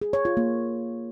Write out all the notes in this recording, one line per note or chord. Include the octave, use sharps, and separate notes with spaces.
G#4
C#5
F4
A#3